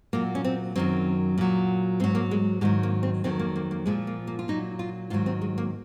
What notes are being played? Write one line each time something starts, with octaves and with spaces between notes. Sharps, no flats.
A#2 F#3 A#3
C#4
C4
F#2 D#3 F#3 C4
A#2 F#3
G#2 F#3 C4
A#3
G#3
G#2 D#3 F#3 G#3
A#3
C4
F2 D#3 F#3 C4
A#3
A#3
A#3
A#2 F3 G#3
A#3
A#3
F4
A#2 F#3 D#4
F4
G#2 D#3 F#3 F4
C4
G#3
A#3